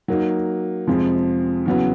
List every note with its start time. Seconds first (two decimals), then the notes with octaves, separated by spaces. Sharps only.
0.08 F#3 A#3 D#4
0.87 F2 C3 F3 G#3
1.66 E2 C#3 F#3 B3